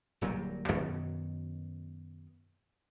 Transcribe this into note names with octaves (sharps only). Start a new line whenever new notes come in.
D1 A#2 F#3 G3
F#2 B2 D#3 F#3